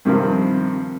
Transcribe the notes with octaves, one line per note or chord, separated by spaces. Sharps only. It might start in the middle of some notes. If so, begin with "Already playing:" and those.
G2 C3 D#3 F3